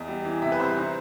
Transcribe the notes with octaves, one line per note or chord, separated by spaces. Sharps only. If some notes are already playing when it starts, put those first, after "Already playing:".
Already playing: E2 D#5
G3
E3
C3 E5
B4
C2 C5
D#4